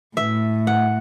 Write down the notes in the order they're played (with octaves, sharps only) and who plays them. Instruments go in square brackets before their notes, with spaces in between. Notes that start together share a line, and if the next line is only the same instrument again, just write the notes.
[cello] A2 [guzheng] E5
[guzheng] F#5